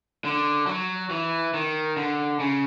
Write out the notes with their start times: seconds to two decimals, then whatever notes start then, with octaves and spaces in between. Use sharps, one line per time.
0.25 D3
0.67 F#3
1.10 E3
1.54 D#3
1.97 D3
2.40 C#3